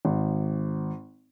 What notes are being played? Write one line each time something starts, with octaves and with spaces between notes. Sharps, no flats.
G#1